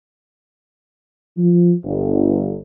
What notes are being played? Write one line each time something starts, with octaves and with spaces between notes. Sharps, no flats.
F3
G1